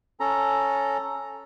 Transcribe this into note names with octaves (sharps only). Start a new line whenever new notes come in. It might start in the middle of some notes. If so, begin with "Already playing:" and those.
C#4 A4 A#5